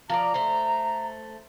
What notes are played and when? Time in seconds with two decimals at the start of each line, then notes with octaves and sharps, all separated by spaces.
0.10 F3 A#4 D5 A#5
0.34 A3 C5